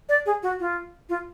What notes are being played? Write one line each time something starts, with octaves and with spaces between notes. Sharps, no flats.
D5
G#4
F#4
F4
F4